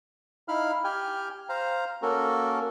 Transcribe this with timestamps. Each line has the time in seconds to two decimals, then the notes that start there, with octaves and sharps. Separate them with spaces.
0.48 D#4 E4 F5 B5 F6
0.84 G4 G5 G#5 F6
1.49 C5 F5 A#5
2.02 A#3 C#4 F#4 A4 A#4